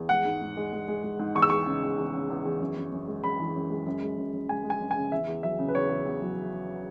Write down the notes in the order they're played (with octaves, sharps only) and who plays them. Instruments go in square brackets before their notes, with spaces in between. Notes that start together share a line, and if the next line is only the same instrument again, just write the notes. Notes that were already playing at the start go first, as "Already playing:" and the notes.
Already playing: [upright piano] E2
G#3 F#5
G#2
G#2
G#3
G#3
G#3
G#3
G#2
E2 C#6
E6
G#3 C#6
C#3
E2
E2
C#3
E2
E2
F#2
F#2
F#2
G#3
F#2 B5
E3
F#2
G#3
F#2
G#3
F#2
F#2
G#3 G#5
G#3
G#5
F#2
G#5
C#3
E2 E5
E2
F#3 E5
C#3
B4
E2 C#5
E2
E2
F#3